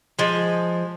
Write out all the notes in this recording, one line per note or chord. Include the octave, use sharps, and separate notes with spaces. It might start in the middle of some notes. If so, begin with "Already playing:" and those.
F3 G#3